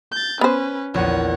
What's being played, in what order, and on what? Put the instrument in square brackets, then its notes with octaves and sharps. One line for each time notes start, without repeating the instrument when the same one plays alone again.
[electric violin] G6 A6
[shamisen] B3 C5 [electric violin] C#4 B4
[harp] A#1 E2 [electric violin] C#5 F#5